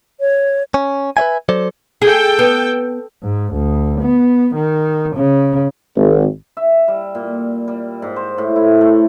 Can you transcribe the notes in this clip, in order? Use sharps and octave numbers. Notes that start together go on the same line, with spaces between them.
C#5
C#4
B4 C#5 E5 G#5
F#3 A4 C5 D5
G#4 A4 G5
B3
G#2
D2
B3
D#3
C#3
G#1
E5
G3
A#2
G3
G#2
C5
A2
E4
A3